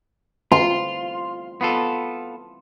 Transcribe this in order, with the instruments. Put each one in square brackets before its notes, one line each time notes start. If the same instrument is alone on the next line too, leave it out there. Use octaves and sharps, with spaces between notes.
[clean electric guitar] F4 [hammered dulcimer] C6
[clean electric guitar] B3 F4 A4